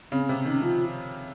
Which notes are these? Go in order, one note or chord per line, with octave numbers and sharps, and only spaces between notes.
C#3 C4
C4
C3
C4
D#3 C#4
F3 F4